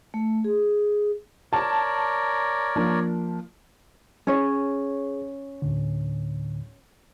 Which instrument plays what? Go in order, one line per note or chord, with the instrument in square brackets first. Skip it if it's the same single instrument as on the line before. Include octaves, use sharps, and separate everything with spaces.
[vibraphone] A3
G#4
[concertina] A#4 C#5 D5 [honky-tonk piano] A5
[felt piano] F3 A#3 D4
[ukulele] C#4 C#5 [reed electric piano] G#4
[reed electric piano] D2 A2 D3